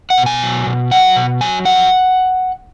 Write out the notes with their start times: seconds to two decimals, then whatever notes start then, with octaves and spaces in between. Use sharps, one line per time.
0.10 F#5
0.18 B2
0.26 G#5
0.43 F#3
0.67 B2
0.91 F#3 F#5
1.16 B2
1.41 F#3 G#5
1.65 F2 F#5